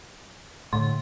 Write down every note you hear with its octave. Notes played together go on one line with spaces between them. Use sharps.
A2 D3 C6